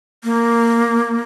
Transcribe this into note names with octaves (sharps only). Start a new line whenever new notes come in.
A#3